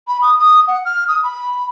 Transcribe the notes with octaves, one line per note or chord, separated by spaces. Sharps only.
B5
D#6
D#6
F#5
F6
D#6
B5